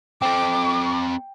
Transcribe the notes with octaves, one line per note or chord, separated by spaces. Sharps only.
C4 A4 G5 D6